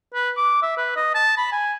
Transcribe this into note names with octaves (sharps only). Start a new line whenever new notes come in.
B4
D6
E5
B4
D#5
A5
B5
G#5